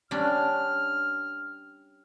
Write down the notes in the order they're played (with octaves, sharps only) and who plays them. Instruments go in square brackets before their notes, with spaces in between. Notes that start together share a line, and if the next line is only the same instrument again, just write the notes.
[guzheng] G3 C#4 D4 [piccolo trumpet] F6